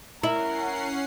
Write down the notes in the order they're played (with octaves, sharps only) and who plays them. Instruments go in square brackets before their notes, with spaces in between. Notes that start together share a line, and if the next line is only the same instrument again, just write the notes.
[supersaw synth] C#4 F#5 C7 [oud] E4 [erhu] A#4